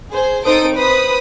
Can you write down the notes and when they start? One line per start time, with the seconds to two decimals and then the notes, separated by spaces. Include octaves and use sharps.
0.12 G#4 C5
0.45 C4 D#4 A4 C5 D#6 D7
0.75 B4 C5 B5 D#6